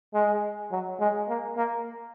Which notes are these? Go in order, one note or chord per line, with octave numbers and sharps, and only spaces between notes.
G#3
F#3
G#3
A#3
A#3